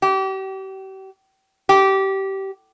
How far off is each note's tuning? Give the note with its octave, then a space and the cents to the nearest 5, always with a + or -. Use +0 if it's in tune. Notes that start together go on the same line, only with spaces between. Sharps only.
G4 -35
G4 -20